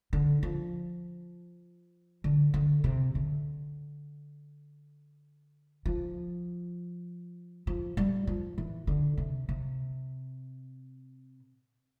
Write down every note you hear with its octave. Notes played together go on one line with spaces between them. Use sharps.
D3
F3
D3
D3
C3
D3
F3
F3
G3
F3
E3
D3
C3
C3